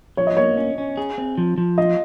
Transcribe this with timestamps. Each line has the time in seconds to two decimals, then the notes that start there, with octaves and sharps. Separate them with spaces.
0.17 F3 C#5
0.27 D#5
0.37 A#3 C#5
0.57 C#4
0.78 C#4
0.97 G#4
1.18 C4
1.38 F3
1.58 F3
1.78 F4 D#5